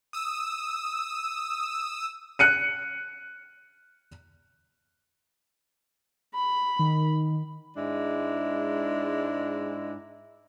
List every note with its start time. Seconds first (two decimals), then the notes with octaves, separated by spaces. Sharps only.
0.13 D#6 E6
2.39 F#6 C#7 D#7
6.34 B5
6.79 D#3
7.75 G#2 G#3 D4 E4